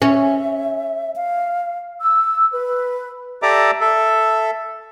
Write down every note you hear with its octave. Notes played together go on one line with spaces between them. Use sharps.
C#4 E5
F5
E6
B4
G4 A4 D5 E5 A#5 D6
A4 E5